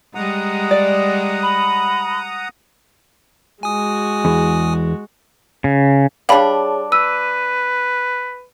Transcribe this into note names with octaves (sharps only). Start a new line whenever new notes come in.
G3 G#3 F#5 A#5 D#6
D5
B5
G#3 F#4 G#5 D#6
E2
C#3
G3 D4 G#4 C#5 F5 A5 B5
B4 E6 D#7